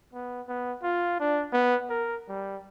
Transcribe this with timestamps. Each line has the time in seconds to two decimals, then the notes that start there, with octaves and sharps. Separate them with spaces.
0.13 B3
0.47 B3
0.83 F4
1.20 D4
1.53 B3
1.90 A#4
2.28 G3